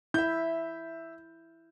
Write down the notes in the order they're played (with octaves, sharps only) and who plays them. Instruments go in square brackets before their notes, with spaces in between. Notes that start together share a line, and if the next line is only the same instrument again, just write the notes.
[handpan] E4 [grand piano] E5 G6